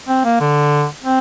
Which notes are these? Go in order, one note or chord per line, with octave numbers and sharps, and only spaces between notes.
C4
A#3
D3
C4